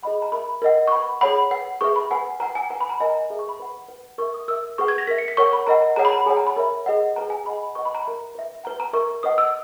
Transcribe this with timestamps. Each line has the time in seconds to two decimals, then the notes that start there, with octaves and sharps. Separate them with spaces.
0.03 G#4 D#5 F#5 B5
0.22 A#5
0.32 A#4 E5 B5
0.62 A#4 D#5 F#5
0.88 C#6
0.92 B4 F#5 B5
1.21 G#4 C#5 F#5 B5
1.51 B4 F#5
1.81 G#4 B4 E5 C#6
1.96 B5
2.11 B4 F#5 G#5
2.40 B4 F#5 A#5
2.55 G#5
2.70 B4 F#5 A#5
2.81 B5
2.89 A#5
2.99 A#4 D#5 F#5 G#5
3.10 A#5
3.30 G#4 B4 E5
3.39 C#6
3.49 B5
3.60 B4 F#5
3.88 B4 F#5
4.18 A#4 E5 C#6
4.34 D#6
4.48 A#4 E5 E6
4.78 G#4 B4 F#5 C#6
4.88 G#6
4.98 A#6
5.07 A#4 E5 B6
5.18 C#7
5.28 B6
5.37 A#4 C#5 F#5 C#6
5.53 B5
5.67 A#4 D#5 F#5 A#5
5.96 G#4 C#5 F#5 A#5
6.05 B5
6.13 A#5
6.26 G#4 C#5 F#5 G#5
6.37 A#5
6.47 B5
6.57 A#4 C#5 E5
6.86 G#4 D#5 F#5
7.16 G#4 B4 F#5 A#5
7.30 G#5
7.45 G#4 D#5 F#5 B5
7.75 B4 D#5 F#5 C#6
7.85 B5
7.95 A#5
8.05 A#4 E5 A#5
8.35 B4 E5
8.64 B4 F#5 A#5
8.80 A#5
8.93 A#4 E5 C#6
9.23 B4 D#5 F#5 D#6
9.38 E6